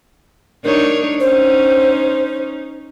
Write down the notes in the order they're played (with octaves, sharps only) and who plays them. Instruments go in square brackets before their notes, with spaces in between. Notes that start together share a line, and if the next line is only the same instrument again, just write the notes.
[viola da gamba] D4 D#4 C#5 [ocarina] A#4
[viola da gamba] C#4 D#4 [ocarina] C5